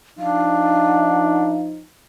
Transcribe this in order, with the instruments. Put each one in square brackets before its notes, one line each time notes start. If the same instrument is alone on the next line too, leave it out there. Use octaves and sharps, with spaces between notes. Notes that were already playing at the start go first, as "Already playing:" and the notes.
[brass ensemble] F3 D#4 [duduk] D4 [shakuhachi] F5